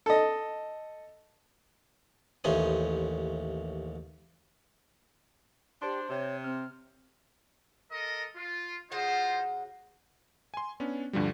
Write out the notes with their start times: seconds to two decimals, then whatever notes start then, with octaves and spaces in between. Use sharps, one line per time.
0.06 A4 D#5
2.44 A1 D#2 A3 C#4 C5 D#6
5.82 D4 G4 C5 C6
6.09 C3 C#5
6.44 C4 F6
7.91 A4 A#4 D#5
8.36 F4
8.92 C#3 D#4 F4 F#4 C5 F#5
10.54 G#5 C6
10.80 B3 C#4 D4
11.13 D2 G2 D3 F3 G3